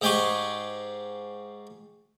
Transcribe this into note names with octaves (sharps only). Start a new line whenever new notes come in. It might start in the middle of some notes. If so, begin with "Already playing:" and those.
G#2 G#3 G4 G5 G#5 C#6